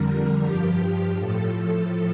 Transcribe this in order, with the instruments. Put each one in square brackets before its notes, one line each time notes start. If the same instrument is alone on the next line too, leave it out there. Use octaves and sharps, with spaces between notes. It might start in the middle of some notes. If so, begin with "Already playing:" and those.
Already playing: [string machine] F2 D3 G3 A#4
G2 F3 G4
A2 F3 A4